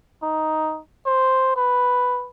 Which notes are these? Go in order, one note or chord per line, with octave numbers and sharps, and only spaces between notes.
D#4
C5
B4